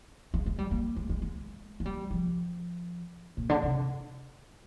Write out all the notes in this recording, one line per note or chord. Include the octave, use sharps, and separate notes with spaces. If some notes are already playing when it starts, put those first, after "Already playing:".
G#3
G#3
G3
A#3
G#3
G#3
G#3
G#3
G3
F3
A#2
D3
C3